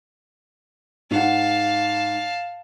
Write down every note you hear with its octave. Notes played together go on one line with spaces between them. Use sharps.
G#2 F5 F#5 A5